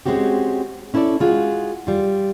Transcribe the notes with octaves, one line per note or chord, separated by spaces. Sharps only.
G#3 C4 C#4 F#4 G4
C#4 E4 A4 B4 D5
G#3 F4 F#4 G#4
G3 F4